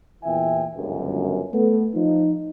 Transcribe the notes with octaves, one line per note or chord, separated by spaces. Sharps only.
E2 A#2 E3 E5 G5 G#5
G1 C#2 F#2
A3 B3 A4
F3 D#4